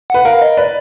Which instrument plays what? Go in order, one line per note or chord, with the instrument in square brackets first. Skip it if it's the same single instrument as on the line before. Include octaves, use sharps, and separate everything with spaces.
[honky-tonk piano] B4 [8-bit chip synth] F#5
[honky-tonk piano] A#4 [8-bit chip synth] F5
[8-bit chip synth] D#5
[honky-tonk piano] B4 [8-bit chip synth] D5